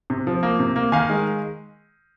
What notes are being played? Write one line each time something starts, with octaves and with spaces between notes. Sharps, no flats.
C3
F3
A#3
C3
A#3
D#3 F5 G#5
G#3